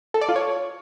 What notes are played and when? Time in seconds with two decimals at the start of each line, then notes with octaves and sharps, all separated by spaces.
0.14 A4
0.21 D5
0.29 F4
0.36 C#5